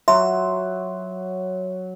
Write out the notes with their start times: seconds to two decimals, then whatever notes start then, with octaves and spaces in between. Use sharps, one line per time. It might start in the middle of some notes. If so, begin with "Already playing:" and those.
0.08 F#3 E5 C6